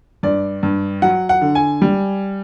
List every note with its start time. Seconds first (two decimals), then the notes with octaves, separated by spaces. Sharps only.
0.23 G2 D5
0.63 G2
1.02 F#3 F#5
1.29 F#5
1.41 D3
1.55 G#5
1.82 G3